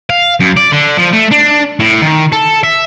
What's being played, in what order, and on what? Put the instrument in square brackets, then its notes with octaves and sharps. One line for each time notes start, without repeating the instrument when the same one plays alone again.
[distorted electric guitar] F5
F#2
D5
D3
F3
A3
D4
A2
D#3
A4
E5